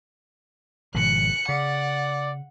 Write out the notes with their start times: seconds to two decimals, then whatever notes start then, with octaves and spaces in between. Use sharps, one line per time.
0.95 G#1 B2 F3 F#6 C#7
1.49 C#3 D5 F#5